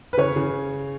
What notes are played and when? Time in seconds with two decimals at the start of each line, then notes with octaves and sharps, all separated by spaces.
0.13 B4
0.17 C#3 C#5
0.36 C#3